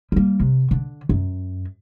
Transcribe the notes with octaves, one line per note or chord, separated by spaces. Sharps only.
G3 A#3
C3
D3
F#2